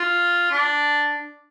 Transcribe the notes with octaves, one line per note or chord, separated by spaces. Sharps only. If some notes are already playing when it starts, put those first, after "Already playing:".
Already playing: F4
D4